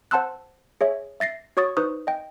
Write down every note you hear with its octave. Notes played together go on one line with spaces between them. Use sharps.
C5 F#5 A5 C6 E6 F#6
G#4 C#5 E5
E5 A6 A#6 C7
F#4 C#5 C#6 D#6 A6
D#4 B4 C5 C#6 D#6
D#5 G5